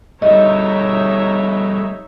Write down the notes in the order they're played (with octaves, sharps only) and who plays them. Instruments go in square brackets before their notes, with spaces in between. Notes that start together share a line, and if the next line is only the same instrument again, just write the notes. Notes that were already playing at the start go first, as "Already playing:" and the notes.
[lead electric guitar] G3 A3 [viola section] D#4 C#5 E5 [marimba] D#5